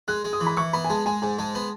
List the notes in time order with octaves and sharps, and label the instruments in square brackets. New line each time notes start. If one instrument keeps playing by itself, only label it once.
[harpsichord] G#3 [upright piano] F#6
[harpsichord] G#3
[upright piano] D#6
[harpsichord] E3
[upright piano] B5
[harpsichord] E3 [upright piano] C#6
[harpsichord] B3 [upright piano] B5
[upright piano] G#5
[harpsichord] G#3 [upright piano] A5
[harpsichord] G#3 [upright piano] G#5
[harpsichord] G#2 [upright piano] G#5
[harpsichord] G#3 [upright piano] A5
[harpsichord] B3